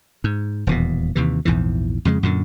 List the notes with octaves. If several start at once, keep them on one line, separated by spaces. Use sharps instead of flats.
G#2
D#1 E2 B2
D#2 C3 E3
A#1 E2 G#2 E3
F2 C#3 G3 G#3
F#2 A#2 D3